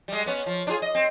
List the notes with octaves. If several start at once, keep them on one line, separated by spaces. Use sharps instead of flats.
G3 G#3
B3 C#4
F3
D4 F4 G#4
D#5
C4